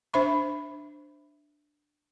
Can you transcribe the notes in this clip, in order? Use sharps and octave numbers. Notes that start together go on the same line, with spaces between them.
D4 C5 E5 B5 C#6